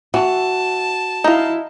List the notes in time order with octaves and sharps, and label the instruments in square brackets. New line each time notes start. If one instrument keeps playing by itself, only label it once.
[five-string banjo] E3 [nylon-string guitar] F#4 [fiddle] A5
[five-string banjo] D#4 F5 [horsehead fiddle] E4